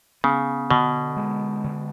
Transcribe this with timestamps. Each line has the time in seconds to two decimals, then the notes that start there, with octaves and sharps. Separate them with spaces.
0.24 C#3 B3
0.71 B2 D3
1.17 G#3
1.64 D3